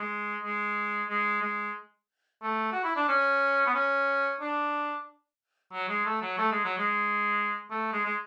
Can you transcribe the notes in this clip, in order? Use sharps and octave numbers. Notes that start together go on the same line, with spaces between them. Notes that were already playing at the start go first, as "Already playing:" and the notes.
Already playing: G#3
G#3
G#3
G#3
A3
F#4
E4
D4
C#4
B3
C#4
D4
F#3
G#3
A3
F#3
A3
G#3
F#3
G#3
A3
G#3
G#3